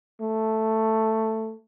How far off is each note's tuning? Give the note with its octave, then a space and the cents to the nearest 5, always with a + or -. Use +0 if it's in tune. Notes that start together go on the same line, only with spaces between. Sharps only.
A3 +5